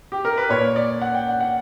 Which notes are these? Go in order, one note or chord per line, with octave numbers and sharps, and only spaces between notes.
G4
A#4
B4
A#2 C#5
D5
F#5
G5
F#5
F#5